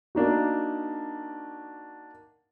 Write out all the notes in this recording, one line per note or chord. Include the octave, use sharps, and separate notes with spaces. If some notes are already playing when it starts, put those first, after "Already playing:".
A#3 D4 D#4 F#4